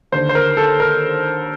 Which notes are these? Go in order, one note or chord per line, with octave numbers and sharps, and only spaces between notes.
D#2 D3 C5
C5
A#4
A4
A#4